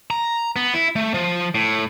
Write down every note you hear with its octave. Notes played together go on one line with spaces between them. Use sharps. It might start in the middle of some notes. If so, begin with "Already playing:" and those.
A#5
B3
E4
A3
F3
A2